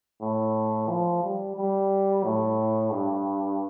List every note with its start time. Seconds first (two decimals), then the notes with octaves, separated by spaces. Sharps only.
0.21 A2
0.89 F3
1.23 G3
1.57 G3
2.24 A2
2.92 G2